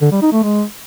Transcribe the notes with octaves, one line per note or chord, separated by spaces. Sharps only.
D3
G3
D#4
A3
G#3